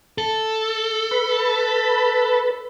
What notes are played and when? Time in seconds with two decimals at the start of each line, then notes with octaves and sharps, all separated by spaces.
0.18 A4
1.11 B4 B5